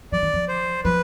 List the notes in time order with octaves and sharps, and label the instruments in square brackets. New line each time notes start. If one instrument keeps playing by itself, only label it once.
[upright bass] F3 [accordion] D5
[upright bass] D#3
F3
[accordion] C5
[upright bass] F3 [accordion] B4